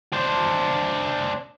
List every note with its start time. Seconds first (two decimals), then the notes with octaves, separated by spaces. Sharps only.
0.13 D4 C5